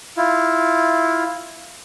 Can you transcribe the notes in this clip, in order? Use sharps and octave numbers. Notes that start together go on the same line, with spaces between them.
E4 F4